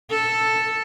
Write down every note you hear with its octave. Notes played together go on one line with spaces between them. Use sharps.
A4